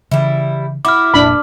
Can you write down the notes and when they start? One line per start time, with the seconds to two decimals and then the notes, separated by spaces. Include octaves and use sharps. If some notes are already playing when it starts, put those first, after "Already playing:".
0.11 C#3 E3 G3 E4
0.85 E4 F#4 D6 F6
1.14 F1 A#2 D4 B5